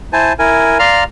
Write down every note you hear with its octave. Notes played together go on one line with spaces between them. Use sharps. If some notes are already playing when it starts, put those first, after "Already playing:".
E4 C5 G#5 A5
E4 A#4 G#5
D5 F5 A#5 C6 F6